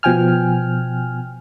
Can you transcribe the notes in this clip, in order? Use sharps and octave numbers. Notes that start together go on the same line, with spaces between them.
B2 F3 G5 G#5 F6